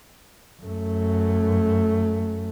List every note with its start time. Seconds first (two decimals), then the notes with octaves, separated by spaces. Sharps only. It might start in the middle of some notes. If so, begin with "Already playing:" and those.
0.62 F#2 A3